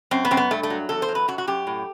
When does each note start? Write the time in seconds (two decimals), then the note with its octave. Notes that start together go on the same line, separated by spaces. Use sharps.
0.11 F#2 C4
0.25 B3
0.31 F#2 C4
0.37 B3
0.51 G2 A3
0.63 A3
0.70 F#3
0.89 E2 A4
1.02 C5
1.08 F#3
1.15 B4
1.28 F#2 F#4
1.38 F#4
1.47 F#2 G4
1.67 A2